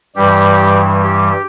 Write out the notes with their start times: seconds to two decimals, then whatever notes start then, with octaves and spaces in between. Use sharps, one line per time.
0.15 G2 E3 G3 G4
1.01 G4